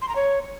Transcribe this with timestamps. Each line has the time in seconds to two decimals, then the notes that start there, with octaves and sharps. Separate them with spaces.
0.02 C6
0.09 A#5
0.16 C#5